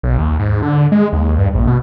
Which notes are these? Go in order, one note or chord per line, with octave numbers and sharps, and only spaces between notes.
B1
D#2
G#2
D3
G#3
D#2
G2
A#1
B2